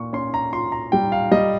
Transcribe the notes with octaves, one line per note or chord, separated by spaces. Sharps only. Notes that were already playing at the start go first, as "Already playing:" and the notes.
Already playing: A#2 C#6
C#4 C6
A#5
F4 C6
A#5
G3 G5
F5
G3 D#5